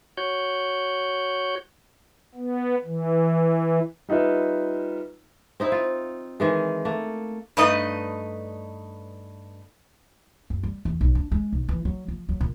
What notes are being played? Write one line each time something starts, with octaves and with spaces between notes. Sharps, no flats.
F#4 C#5 G6
B3
E3
G3 D#4 F4 B4 E5
C4 D#4 E4
F4
D#3 E3 G#3
A3 A#3
G2 A3 D#4 B4 D#5
F#2
G3
E2
B1
D4
G#3
B1
E3
F#3
F3
F#3
A#2